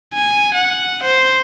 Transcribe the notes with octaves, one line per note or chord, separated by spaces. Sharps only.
G#5
F#5
C5